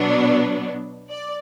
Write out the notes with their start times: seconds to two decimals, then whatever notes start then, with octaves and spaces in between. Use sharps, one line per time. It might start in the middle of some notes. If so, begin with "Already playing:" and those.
Already playing: B2 F#3 B3 D4
1.11 D5